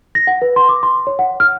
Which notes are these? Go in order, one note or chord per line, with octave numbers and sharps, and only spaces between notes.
A#6
F#5
B4
C6
D6
C6
C#5
F#5
F6